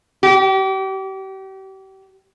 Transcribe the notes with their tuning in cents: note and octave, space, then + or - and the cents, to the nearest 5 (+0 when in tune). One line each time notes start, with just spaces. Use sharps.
G4 -35